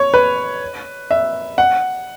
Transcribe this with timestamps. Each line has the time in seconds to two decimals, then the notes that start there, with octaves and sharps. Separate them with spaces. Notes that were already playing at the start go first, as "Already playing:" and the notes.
Already playing: C#5
0.14 B4
1.11 E5
1.58 F#5